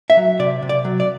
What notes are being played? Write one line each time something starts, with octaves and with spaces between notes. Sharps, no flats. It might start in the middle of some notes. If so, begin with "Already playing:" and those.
E5
F#3
C3 D5
C3
D5
F#3
D5